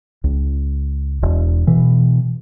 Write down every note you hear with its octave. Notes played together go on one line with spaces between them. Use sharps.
C#2
E1
B2 E3